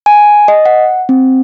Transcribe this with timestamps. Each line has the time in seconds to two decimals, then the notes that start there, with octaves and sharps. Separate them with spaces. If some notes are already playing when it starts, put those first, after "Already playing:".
0.06 G#5
0.48 D#5
0.66 F#5
1.09 C4